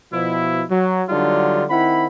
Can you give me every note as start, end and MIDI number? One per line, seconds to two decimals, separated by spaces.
0.13 0.63 47
0.13 0.63 53
0.13 0.63 64
0.71 1.03 54
1.09 1.64 50
1.09 1.64 54
1.09 1.64 55
1.09 1.64 62
1.09 1.64 63
1.09 1.64 65
1.70 2.07 51
1.70 2.07 60
1.70 2.07 64
1.70 2.07 78
1.70 2.07 83